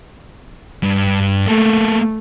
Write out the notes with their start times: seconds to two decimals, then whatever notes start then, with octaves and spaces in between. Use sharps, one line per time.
0.83 G2
1.47 A3 A#3 A4